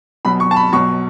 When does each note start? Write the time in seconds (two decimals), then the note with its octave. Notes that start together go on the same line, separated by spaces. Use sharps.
0.25 B1 B2 F#3 B5
0.40 C#6
0.51 A5
0.56 B5
0.73 B1 B2 F#3 C#6